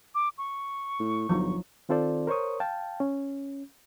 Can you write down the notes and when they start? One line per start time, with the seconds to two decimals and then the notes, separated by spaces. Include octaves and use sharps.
0.15 D6
0.38 C#6
1.00 A2
1.29 G1 F3 F#3 D#4
1.89 D#3 C4 F4 A4 C5 D5
2.27 A#4 C5 C#5 C#6 D#6
2.60 F5 G5 A5
3.00 C#4